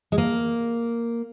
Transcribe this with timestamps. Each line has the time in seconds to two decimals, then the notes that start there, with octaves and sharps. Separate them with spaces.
0.12 G#3
0.18 A#3